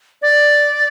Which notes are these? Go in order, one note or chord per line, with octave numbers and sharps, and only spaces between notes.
D5